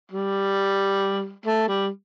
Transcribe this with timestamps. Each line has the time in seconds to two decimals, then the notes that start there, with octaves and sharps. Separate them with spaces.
0.12 G3
1.46 A3
1.68 G3